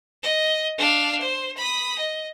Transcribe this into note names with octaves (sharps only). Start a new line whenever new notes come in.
D#5
D4 F5
C5
B5 D#6
D#5